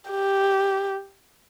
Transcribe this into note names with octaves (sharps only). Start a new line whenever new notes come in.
G4